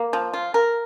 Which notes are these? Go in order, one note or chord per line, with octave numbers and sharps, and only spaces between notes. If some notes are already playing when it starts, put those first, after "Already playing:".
Already playing: A#3
F3
F4
A#4